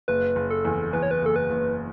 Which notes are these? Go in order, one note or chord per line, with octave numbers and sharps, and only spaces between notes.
F#1 B4
F#1
A4
E2
E2 B4
C#5
B4
F#1 A4
B4
F#1